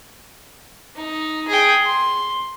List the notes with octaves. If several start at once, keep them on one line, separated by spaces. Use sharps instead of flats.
D#4
G#4 G5
C6